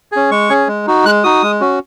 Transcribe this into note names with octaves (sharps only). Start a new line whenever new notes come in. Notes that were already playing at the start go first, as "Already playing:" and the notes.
C#4 G#4
G#3 C#6
C#4 G#4
G#3
D#4 F#4
G#3 F#6
D#4 F#4 D#6
G#3
C#4 F#4